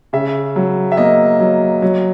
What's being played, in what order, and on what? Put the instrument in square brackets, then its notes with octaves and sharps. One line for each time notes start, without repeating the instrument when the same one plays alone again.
[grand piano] C#3 E5
F#3
E5
A#3 D#5
F#3
F#3